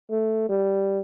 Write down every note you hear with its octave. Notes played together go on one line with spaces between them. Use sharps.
A3
G3